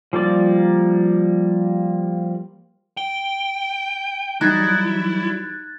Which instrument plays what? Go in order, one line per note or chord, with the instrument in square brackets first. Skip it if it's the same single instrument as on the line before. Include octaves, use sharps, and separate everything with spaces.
[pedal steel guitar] F3 G3 A#3 D5
[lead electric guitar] G5 [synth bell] G7
[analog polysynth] E3 F#3 G3 [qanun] D#4 [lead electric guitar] E4 [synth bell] F#6 G#6 A6